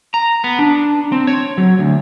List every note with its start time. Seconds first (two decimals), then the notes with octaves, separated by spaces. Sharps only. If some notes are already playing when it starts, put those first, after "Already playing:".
0.14 A#5
0.44 B3
0.59 D4
1.12 C4
1.27 C#5
1.58 F#3
1.79 D2